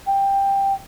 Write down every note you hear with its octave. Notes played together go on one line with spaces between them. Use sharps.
G5